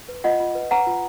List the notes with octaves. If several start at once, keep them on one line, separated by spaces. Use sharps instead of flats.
B4
F4 D#5 F#5
F4
B4
B4 F#5 A#5
F4